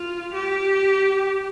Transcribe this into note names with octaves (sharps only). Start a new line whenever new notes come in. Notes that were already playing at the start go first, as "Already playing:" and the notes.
Already playing: F4
G4